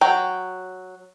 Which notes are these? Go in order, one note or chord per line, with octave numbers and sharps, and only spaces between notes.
F#3 G5